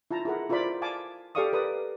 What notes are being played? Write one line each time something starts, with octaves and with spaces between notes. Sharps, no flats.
E4 F4 A5 A#5
E4 G#4 A#4 F#5
E4 F4 A#4 C5 D5 B5
F5 G#5 A5 D6
G4 A4 D5 F5 C#6 D#6
A#4 B4 D5 D#6